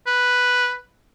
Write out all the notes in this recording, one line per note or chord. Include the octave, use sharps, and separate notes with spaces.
B4